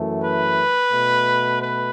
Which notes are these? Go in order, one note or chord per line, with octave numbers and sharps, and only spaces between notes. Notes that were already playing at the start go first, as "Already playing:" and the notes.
Already playing: F#2 E3 A3
B4
B2 A3
B4